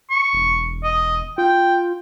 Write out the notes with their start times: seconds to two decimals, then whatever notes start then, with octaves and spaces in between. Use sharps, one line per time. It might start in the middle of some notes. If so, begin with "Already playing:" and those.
0.11 C#6
0.33 E1
0.84 D#5
1.38 F4 G5